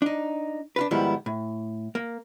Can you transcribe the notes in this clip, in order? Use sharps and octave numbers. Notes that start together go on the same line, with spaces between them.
D4 D#4
D4 F4 B4
G#2 D#3 F3 G3 B3 E4
A2
A#3